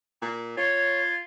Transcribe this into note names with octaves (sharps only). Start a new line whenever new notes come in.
A#2
F4 C#5 G#6